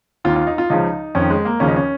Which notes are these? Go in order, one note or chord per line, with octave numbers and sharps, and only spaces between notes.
D#2 D#3 F4
F4
D#4
F4
C#2 C#3 F3 D#4
F2 D#3 C#4
G#3
A#3
D#2 C#3 F3 C#4
D#4
C#4